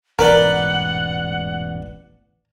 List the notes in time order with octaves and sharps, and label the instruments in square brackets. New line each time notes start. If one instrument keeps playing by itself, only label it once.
[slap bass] E1 A1 G#2 [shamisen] A#4 [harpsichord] B4 D5 G5 [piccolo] F#5